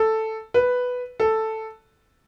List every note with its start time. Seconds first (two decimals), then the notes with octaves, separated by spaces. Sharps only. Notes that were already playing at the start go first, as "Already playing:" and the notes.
Already playing: A4
0.54 B4
1.20 A4